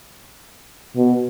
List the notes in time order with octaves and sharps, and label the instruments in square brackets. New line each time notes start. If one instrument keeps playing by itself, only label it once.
[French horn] B2